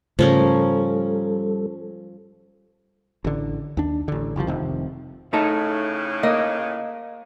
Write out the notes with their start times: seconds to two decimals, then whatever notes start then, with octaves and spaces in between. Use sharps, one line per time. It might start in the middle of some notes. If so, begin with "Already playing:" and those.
0.19 G#2 C#3 F3 G3 A3 C#4 A4 A#4
3.25 A1 D3
3.77 D#2 D4
4.08 A1 D3
4.36 F#1 C2 B2 F3
4.47 F1 C3 D#3
5.33 A2 C#3 A3 D#4 A4
6.23 A#3 D#5